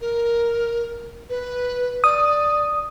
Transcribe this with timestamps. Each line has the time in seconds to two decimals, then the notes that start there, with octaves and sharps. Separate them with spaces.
0.01 A#4
1.30 B4
2.04 D5 D#6